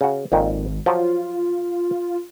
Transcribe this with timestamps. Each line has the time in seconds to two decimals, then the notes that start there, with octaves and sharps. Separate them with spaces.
0.01 C#3 F#4
0.32 G#1 F2 A#2 D#3
0.86 F3 F#3 F4